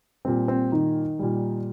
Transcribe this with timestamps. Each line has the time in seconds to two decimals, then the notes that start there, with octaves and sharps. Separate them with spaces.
0.25 A#2 G3 C4
0.48 C4
0.72 D#3 D#4
1.19 A#2 G3